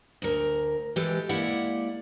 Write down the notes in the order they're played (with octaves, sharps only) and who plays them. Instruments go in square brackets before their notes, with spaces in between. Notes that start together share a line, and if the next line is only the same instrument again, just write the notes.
[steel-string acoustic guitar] D2 A#4
E3 G#3 G4 A4
G#3 A#3 E4 G4 D5 F#5